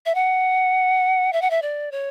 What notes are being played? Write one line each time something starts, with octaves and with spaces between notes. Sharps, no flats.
E5
F#5
E5
F#5
E5
D5
C#5